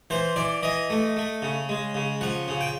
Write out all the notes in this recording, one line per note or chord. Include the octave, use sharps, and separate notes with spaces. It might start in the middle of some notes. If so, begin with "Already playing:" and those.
E3 C5
E3 D5
E3 D#5
A3
A3
C#3
G#3
C#3
F3 F#5
C#3
G5